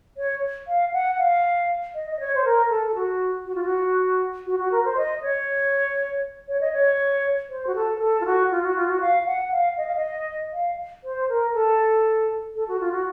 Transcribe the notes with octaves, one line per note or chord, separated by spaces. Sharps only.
C#5
F5
F#5
F5
D#5
D#5
C#5
C5
A#4
A4
A4
F#4
F#4
F4
F#4
F#4
F#4
A#4
C5
D#5
C#5
C#5
D#5
C#5
C5
F#4
A4
A#4
A4
F4
F#4
F4
F#4
F4
F#4
F5
F#5
F5
D#5
F5
D#5
F5
C5
A#4
A4
A4
F#4
F4
F#4